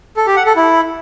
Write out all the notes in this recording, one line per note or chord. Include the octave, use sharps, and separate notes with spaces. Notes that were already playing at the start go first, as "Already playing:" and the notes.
A4
G4
F#5
A4
E4